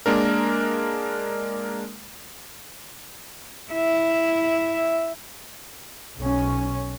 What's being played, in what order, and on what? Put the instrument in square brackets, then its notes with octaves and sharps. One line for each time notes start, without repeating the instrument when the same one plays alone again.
[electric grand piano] G#3 A#3 D4 A#4
[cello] E4 E5
[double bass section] B1 C#4